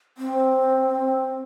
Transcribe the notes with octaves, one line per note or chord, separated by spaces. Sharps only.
C4